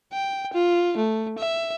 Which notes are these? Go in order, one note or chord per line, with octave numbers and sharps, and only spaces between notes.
G5
F4
A3
E5